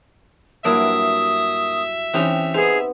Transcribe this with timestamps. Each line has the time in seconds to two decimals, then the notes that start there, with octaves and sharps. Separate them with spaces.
0.65 G2 F#3 A#3 D4 E4 E5 D#6
2.14 E3 C4 C#4 D#4 G4
2.54 B3 D#4 G#4 C5